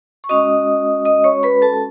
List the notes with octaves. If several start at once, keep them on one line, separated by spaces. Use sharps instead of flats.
C#6
G#3 C#4 F#4 D#5 D#6
D#5 D#6
C#5 C#6
B4 B5
A4 A5